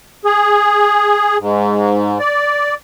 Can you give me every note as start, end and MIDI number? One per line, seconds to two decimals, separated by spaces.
0.25 1.37 68
1.40 2.18 44
2.20 2.74 74